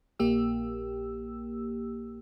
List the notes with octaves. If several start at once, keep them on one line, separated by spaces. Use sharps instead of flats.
A#1 A#3 G4 E6